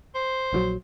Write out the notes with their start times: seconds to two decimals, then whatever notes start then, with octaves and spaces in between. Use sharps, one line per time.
0.15 C5
0.53 A#1 D#3 F#3